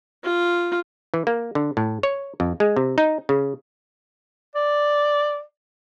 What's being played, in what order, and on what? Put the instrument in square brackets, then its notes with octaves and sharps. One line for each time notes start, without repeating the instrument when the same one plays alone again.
[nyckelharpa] F4
[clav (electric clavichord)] E3
A#3
D3
A2
C#5
F2
G#3
C3
D#4
C#3
[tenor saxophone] D5